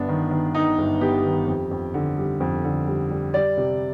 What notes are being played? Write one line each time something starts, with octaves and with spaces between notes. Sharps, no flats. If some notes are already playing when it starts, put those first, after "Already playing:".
Already playing: G1 B3 D4
D#3
D#3
D#3 D#4
G1
B3 G4
D#3
F2
F2
D3
G3
F2
D3
G3
G3
G3 D5
C3